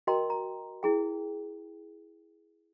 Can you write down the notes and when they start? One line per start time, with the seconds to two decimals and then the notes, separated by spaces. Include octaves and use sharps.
0.07 F#4 A#4 D#5 G5 A#5 C6
0.30 A#5
0.83 E4 G#4 G5